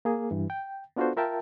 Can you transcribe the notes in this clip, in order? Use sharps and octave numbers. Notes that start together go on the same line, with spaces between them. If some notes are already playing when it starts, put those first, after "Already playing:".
A#3 G#4
G2 E3
G5
B3 D4 F4 F#4 A4 C5
F4 A#4 E5 G5 A5